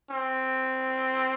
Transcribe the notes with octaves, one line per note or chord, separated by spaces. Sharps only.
C4